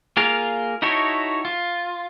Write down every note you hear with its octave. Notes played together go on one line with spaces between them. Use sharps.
A#3 F4 G#4 A#4 F5
D#4 E4 F#4 A4 C#5
F4